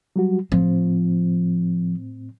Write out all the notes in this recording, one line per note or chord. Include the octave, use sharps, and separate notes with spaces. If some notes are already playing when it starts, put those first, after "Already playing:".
F#3 G3 F#4
A2 F3 C4